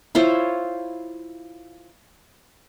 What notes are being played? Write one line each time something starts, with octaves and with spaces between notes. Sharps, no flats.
E4 F4 C5 C#5